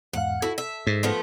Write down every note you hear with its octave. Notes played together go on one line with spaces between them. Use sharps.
E2 G#2 F5 F#5
E4 F#4 A4
E5
G#2
F3 A3 B3